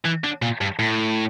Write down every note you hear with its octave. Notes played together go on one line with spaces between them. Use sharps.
E3
D3
A#2
G2
A2